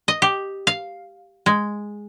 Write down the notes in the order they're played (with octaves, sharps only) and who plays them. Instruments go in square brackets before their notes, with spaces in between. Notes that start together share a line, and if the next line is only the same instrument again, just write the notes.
[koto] D#5
G4
F5
G#3